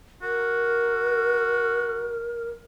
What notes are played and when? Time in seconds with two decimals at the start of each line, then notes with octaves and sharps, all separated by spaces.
0.22 F#4 A#4